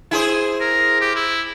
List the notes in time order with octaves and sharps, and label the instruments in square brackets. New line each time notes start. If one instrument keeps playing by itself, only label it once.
[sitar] E4 G#4 C5
[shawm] A#4
G4
E4